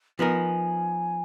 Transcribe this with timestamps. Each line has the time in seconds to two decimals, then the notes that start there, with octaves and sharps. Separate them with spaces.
0.19 F3 B3 D#4 A#4 G#5